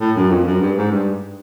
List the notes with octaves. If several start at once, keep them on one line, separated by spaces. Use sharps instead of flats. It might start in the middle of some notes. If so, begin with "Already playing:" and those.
A2
F#2
F2
F#2
G2
G#2
G2